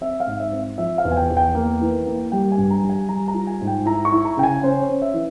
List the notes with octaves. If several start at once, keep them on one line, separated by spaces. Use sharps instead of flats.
C4 E5
F5
G#2
E5
C4
F3 E5
F5
E2
G#5
G5
E2
G5
A#3
E3
A#3
G3 G5
G#5
G2
A#5
G3
G#5
G3 A#5
A#5
F4
G#5
G#2
G5
E4 A#5
C#6
E4
A#5
C#3 G5
G#5
C#4 C5
C#5
C#4
E5
E3